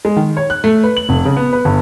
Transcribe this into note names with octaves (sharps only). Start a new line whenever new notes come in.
G#3
D#3
C#5
F#6
A3
B4
F#7
F1
C#3
B3
B4
G1